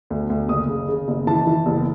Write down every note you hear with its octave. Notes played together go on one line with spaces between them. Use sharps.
D2
D2
F#1 D#6
C#3
C#3
F#1
E3 A5
E3
F#1